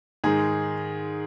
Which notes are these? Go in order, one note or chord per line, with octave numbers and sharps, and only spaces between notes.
G#2 D#3 G#3 G#4